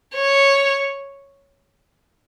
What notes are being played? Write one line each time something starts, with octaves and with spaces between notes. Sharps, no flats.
C#5